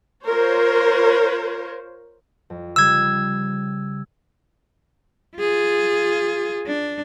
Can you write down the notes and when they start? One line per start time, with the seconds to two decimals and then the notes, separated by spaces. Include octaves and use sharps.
0.25 F4 A#4 C5 C#5
2.50 F2
2.76 C#3 G3 E6 G#6
5.37 F4 G#4
6.66 D4